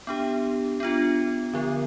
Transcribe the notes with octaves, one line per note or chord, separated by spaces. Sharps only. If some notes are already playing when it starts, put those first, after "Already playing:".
B3 D4 G4
B3 D4 F4
D3 F3 B3